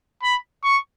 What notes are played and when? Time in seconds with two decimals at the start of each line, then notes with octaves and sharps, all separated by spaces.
0.23 B5
0.64 C#6